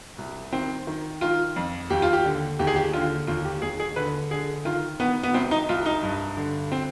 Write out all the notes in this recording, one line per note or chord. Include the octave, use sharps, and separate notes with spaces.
C2
D#3 C4
D#3
D#3 F4
F2
D#2 G4
F4
G4
D3
D#2 G4
G#4
G4
D3 F4
D#2 F4
G4
D#2 G#4
G#4
D3 B4
D3 G#4
D#3 F4
D#3 B3
B3
C2 C4
D#4
C2 F4
D#4
G2
D3
C4